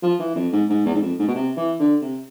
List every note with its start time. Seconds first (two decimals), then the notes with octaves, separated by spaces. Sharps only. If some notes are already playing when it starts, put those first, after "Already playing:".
0.03 F3
0.20 E3
0.36 F2
0.53 G#2
0.70 G#2
0.86 E2
0.95 G#2
1.02 F2
1.19 G#2
1.28 B2
1.35 C3
1.57 E3
1.79 D3
2.02 C3